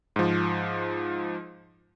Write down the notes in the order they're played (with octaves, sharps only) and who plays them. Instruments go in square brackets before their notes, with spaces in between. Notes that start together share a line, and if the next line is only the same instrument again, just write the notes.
[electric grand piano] G#2 F3